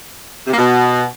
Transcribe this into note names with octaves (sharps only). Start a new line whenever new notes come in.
C3
A#3
B2